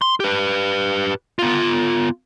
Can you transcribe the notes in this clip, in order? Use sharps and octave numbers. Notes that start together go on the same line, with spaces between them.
C6
G4 B4
B3 F4